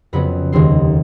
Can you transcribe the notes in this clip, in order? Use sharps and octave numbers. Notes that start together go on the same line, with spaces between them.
F2 C#3 F#3 B3 B5
F1 D#2 D#3 G#3 C6